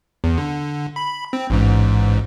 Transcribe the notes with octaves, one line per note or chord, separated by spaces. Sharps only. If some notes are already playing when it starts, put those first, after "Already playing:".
E2
D3
B5
C4
A1 G#2